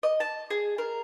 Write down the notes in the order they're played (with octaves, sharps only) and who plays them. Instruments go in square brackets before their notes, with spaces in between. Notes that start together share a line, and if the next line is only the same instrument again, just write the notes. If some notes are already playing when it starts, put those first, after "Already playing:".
[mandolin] D#5
A5
G#4
A#4